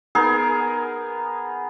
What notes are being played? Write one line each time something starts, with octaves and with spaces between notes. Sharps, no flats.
B3 D#4 G#4 A#4